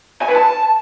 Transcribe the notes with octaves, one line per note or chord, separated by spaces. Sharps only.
G#5
B4
A5